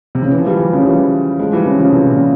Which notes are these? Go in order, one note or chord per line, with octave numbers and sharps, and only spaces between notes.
C3
C#3
E3
F3
E3 G3
E3 G3
C#3 F3
E3 G3
F3 G#3
E3 G3
C#3 F3
C#3 F3
C3 E3
A#2 C#3